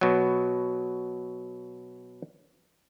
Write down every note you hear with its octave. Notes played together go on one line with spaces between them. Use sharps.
B2 F#3